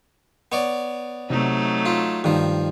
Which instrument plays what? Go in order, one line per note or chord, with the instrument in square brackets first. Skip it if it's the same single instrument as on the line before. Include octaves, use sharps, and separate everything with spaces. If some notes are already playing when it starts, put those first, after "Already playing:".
[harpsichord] B3 C#5 D5
[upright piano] C3 [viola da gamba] F#3 A3 D#4
[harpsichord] F4
[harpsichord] G2 F3 [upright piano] D#3